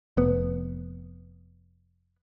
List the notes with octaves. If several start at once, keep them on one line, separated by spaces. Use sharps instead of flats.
F1 B3